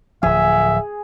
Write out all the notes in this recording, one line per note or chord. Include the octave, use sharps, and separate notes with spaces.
D1 F3 G#4 E5